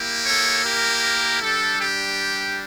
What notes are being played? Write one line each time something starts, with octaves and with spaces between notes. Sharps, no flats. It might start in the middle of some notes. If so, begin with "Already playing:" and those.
Already playing: A#3 E4 G4
A4 C#5
G4 A#4
G3 D4 G4 A4
G4